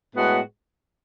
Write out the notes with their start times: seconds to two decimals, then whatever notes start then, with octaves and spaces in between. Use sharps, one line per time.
0.14 A2 G#3 B3 F#4